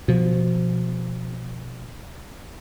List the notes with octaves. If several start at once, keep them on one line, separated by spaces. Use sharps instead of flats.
B2 F3